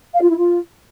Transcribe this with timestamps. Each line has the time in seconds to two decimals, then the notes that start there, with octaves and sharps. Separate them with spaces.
0.14 F5
0.22 F4
0.30 E4
0.38 F4